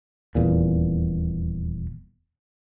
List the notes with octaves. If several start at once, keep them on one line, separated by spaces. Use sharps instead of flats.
D#1 E2 A#2